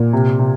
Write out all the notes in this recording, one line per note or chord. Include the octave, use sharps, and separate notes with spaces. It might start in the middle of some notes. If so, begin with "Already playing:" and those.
Already playing: A#2
C3
C3